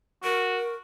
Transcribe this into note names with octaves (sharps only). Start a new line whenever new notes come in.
F#4 A#4